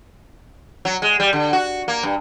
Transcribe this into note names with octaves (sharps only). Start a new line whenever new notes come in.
F#3
G#3
G3
D3
F#4
A#3
G2